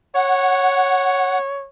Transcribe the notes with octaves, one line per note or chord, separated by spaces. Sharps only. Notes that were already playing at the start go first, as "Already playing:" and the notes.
C#5 F#5